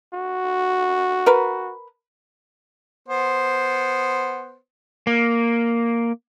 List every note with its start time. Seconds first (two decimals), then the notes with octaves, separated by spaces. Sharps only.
0.14 F#4
1.26 A#4 B4
3.09 B3 C5
5.07 A#3